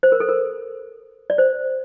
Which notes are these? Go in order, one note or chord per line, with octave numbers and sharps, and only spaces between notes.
C5
A#4
A4
A#4
D5
C5